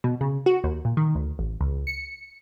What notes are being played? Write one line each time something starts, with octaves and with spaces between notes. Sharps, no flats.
B2
C#3
F#4
D#2
A#2
D#3
D2
A1
C#2
C#7